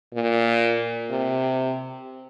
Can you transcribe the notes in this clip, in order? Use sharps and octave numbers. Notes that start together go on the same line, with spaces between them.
A#2
C3